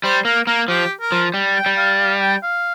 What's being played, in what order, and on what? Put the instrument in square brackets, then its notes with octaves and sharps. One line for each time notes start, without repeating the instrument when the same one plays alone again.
[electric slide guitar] G3 [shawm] C5
[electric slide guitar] A#3 [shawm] A#4
[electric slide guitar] A#3 [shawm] A#4
[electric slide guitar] F3 [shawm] G4
[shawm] A#4
[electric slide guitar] F3
G3
[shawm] G5
[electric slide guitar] G3
[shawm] F5
F5
G5
F5